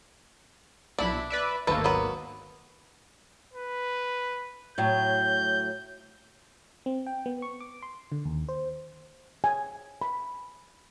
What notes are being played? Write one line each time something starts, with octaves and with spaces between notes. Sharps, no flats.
B1 D4 E4 B5
B4 D5 E5
G#1 D#2 A3 A#3 A4 B4
F#3 B3 B4
B4
A2 F#3 G6
C4
G5
B3
C#6
D6
C6
D3
D#2
C5
G#5
B5